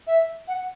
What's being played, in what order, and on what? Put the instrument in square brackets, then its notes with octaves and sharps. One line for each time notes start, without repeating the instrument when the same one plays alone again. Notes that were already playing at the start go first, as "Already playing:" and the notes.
[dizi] E5
F#5